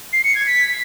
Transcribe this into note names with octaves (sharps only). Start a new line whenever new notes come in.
C7
C#7
G#6
B6